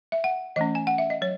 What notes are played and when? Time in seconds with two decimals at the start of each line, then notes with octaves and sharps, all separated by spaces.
0.12 E5
0.24 F#5
0.56 E3 A3 C#4 D#5
0.75 G#5
0.87 F#5
0.98 E5
1.10 D#5
1.22 F#3 C#5